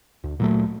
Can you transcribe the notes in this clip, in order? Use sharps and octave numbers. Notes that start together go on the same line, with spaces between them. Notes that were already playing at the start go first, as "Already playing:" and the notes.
D2
A#2 F#3 A3